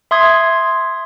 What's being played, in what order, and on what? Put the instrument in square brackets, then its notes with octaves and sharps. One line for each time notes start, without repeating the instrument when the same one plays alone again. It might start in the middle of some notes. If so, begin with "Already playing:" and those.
[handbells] E5 C6 D#6 G#6